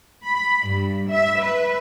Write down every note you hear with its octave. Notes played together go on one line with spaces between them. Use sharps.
B5
G2
E5
B4